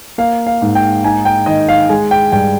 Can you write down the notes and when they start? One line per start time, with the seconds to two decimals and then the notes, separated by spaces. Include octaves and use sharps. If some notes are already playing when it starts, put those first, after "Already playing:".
0.18 A#3 F5
0.47 F5
0.62 G#2
0.75 G5
1.04 D#4 G#5
1.25 G5
1.46 D#3 D#5
1.69 F5
1.90 G#3 G#5
2.11 G5
2.32 G2 G5